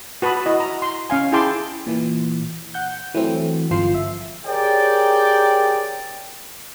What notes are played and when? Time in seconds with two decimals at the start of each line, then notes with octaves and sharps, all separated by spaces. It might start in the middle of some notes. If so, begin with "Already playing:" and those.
0.22 F#4 B4 A5 B5 D#6
0.46 E4 F#4 D#5
0.60 A#5
0.82 C6
1.10 C#4 F5 G#5
1.32 E4 G#4 G5 A5 C6 D6
1.86 A#2 E3
2.74 F#5 G6
3.14 E3 F#3 A3 C4
3.71 G1 F3 C5 C7
3.94 E5
4.46 G4 G#4 A#4 C#5 D5 G5